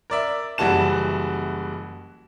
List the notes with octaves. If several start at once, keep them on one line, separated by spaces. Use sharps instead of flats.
A#4 D5 E5
F#1 E3 G3 F#4 A5 E7